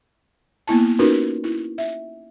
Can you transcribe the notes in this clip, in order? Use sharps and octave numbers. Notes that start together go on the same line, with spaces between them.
A#3 B3 E4 A5
C#4 D#4 F4 F#4 A#4 B4
E4
E5